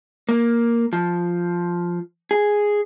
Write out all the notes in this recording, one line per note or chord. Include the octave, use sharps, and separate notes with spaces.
A#3
F3
G#4